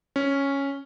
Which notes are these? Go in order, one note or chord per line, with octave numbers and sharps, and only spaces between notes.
C#4